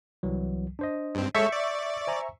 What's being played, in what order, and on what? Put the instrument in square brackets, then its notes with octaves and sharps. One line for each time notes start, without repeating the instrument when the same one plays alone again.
[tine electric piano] C2 E3 F#3
D4 C5 D#5
[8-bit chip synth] G2 C4
[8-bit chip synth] G#3 A4 C#5 [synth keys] E5 C#6 [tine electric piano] G6 C#7
[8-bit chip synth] D5
[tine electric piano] C5 G#5 A#5